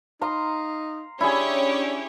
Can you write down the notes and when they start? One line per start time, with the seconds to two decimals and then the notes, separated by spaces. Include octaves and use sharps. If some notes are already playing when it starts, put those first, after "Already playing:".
0.21 D#4 F5 A#5 C6
1.21 C#4 D4 E4 G4 G#4 C#5